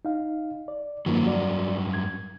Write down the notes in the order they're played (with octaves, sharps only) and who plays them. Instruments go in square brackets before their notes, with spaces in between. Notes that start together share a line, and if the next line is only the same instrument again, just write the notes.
[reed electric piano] D#4 F5
D5
[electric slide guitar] G2 F#3 [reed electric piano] D#3 F3 A#3
[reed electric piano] F#4 D5
G#6